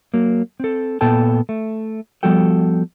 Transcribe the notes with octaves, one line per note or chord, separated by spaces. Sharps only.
F#3 A#3
C4 A4
A#2 B3 A4 G5 A5
A3
F3 G3 B3 F#4 A4 G5